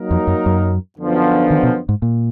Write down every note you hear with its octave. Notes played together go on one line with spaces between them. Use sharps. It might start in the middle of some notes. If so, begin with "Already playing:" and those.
Already playing: F#3 A#3 D#4 A#4
F2
F#2
F#2
F#2 D3 F3 B3 D4
D#3
B2
G#2
A#2